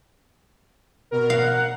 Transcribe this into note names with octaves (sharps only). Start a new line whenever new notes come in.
B2 A#4
F5 F#5